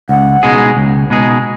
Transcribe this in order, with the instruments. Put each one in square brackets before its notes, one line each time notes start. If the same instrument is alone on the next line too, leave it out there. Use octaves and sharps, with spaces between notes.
[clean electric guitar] C#2 [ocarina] F#5
[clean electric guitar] B2 G#3 D#4 G#4
C#2
B2 G#3 D#4 G#4